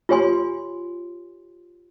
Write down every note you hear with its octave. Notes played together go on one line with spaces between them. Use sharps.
F4 G4 C#5 G#5 C6